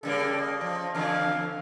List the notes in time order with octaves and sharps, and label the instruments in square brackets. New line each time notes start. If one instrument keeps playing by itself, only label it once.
[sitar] C#3 G3 A#3 [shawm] A4
[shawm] D#5
[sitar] F3
[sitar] E2 D3 [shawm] F5